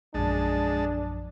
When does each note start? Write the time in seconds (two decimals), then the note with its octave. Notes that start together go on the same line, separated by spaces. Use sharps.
0.14 A#1 F#2 G#3 D4 A5